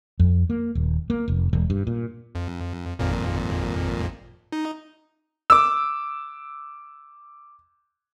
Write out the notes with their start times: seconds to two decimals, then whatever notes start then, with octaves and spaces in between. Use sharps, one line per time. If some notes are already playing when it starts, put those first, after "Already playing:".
0.19 F2
0.50 A#3
0.75 D#1
1.10 A#3
1.28 F1
1.53 E1
1.70 G2
1.87 A#2
2.35 F2
2.99 G#1 F2 A#2
4.52 D#4
5.50 D6 E6